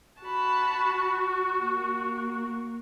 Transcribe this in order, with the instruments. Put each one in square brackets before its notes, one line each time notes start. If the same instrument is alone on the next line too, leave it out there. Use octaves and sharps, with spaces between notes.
[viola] F#4 [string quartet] A5 B5
[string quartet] A#3